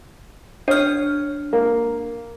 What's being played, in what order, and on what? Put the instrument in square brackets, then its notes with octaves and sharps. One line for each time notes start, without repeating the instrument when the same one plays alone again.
[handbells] D4 F6 [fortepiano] C#5
[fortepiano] A#3